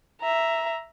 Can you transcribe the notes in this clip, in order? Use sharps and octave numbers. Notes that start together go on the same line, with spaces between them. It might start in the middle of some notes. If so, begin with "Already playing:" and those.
E5 A#5